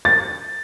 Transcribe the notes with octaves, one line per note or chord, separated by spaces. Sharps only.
A6